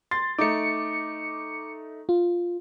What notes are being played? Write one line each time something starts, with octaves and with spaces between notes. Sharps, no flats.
C6 A6
A3 D#4 D6 C#7
F4